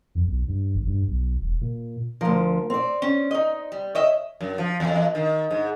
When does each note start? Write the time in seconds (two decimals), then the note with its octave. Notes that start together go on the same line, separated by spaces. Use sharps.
0.15 F2
0.27 B1
0.48 G2
0.75 G1
0.87 G2
1.08 B1
1.41 E1
1.61 A#2
2.21 D2 F3 A#4
2.70 C4 D5
3.02 C#4
3.31 D#4 D#5
3.72 G3
3.95 C#5 D#5 E5
4.41 F#2
4.58 F3
4.80 E2
5.15 D#3
5.51 G#2